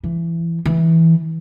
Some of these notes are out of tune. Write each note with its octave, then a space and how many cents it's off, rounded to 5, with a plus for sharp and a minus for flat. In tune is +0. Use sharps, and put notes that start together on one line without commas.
E3 +25
E3 -10